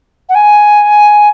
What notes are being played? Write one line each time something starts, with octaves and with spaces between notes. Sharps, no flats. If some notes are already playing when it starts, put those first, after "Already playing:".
F#5
G#5